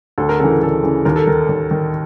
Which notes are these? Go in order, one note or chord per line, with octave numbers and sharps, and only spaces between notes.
D2 A4
A#4
C#3 E3 A4
A#4
D2 A4
C#3 E3
D#2 A#4
A4
D#3 A#4
D#2
D#3